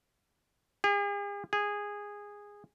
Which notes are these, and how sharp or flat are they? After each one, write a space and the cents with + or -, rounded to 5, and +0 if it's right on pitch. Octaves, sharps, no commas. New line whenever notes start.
G#4 -45
G#4 -15